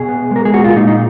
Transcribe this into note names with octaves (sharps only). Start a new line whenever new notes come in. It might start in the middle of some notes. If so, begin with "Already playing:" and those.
Already playing: B2 G#4
B3
G#3 A#4
G#4
A#2 F#4
F4
A#2 D#4
D#4